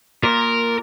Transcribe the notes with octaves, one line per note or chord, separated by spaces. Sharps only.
A#2 A#4